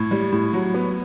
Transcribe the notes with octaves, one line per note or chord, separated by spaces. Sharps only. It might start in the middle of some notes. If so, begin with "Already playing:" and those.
Already playing: A2
G3
A2
F#3
B3